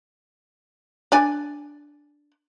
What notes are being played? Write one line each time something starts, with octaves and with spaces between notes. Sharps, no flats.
D4 D5 G#5